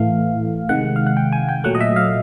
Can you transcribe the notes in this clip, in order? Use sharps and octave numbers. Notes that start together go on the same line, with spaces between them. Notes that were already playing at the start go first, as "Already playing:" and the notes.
Already playing: A2 E3 A3 F5
C3 D#3 G#3 F#5
F5
F#5
G5
G#5
G5
A#2 F#3 A3 F#5
D#5
E5
F5